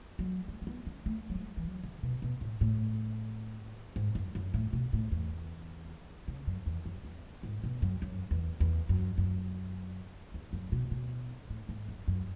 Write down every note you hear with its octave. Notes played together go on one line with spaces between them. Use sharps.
F#3
A3
C#4
B3
C#4
A3
F#3
G#3
E3
F#3
D3
B2
B2
A2
A2
G#2
F#2
F#2
A2
B2
A2
E2
C#3
F#2
E2
F#2
E2
G#2
B2
F#2
F#2
E2
E2
F#2
F#2
E2
F#2
B2
B2
A2
G#2
F#2
F#2